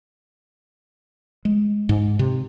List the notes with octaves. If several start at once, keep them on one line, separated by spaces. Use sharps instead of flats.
G#3
G#2
C3